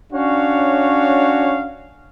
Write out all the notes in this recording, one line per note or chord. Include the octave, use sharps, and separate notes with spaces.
C#4 D4 F#4 C#5 F5